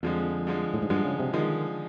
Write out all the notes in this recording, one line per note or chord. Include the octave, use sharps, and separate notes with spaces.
F2 D3 F3 G#3
D3 F3 G#3
A2
G#2
G2 D3 F3 G#3
C#3
C3
D3 D#3 F3 G#3